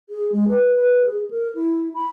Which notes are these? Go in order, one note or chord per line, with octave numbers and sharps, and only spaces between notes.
G#4
G#3
B4
B4
G#4
A#4
E4
B5